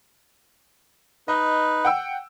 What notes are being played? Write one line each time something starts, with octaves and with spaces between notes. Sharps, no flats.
D#4 B4 D#5
F#5 G5 E6